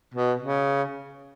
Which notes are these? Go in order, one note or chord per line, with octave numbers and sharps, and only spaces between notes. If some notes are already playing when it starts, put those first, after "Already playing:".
B2
C#3